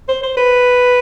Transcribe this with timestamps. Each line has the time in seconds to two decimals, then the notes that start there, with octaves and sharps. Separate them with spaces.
0.09 C5
0.23 C5
0.37 B4